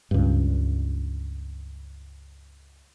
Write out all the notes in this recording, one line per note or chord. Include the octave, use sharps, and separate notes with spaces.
C#2 G2